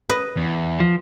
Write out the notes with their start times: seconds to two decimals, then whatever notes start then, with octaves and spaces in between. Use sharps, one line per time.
0.09 B4 D#5
0.36 E2
0.80 F3